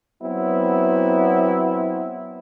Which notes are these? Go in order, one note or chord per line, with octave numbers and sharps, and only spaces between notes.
F#3 B3 C4 E4